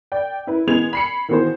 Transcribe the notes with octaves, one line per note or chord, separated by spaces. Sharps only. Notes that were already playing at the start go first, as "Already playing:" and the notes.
D5 G5
E4 B4
E3 G#3 B3 G#4 G#6 F7
B5 C7 C#7
D#3 E3 B3 F#4 G#4 C5